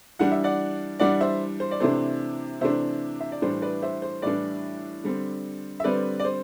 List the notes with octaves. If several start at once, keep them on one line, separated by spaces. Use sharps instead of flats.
E3 G3 D4 F#5
E5
D5 F#5
E3 G3 D4 D5 F#5
C5 E5
C5
D5
C3 E3 A3 D4 C5
C3 E3 A3 D4 C5 E5
E5
D5
A2 E3 G3 D4 C5
B4 D5
C5 E5
C5
A2 E3 G3 D4 B4 D5
D3 G3 C4
E5
D3 G3 C4 B4 D5
D5
C5